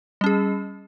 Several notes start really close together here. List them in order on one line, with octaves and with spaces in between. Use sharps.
G3 C#4 G#4